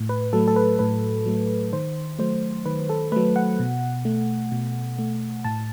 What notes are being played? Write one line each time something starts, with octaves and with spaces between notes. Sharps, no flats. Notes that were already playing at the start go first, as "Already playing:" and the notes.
Already playing: A2
B4
F#3 A3 A4
A4
B4
A2 B4
F#3 A3
D#3 C5
F#3 A3 C5
D#3 B4
A4
F#3 A3 B4
F#5
B2
A3
B2
A3
A2 A5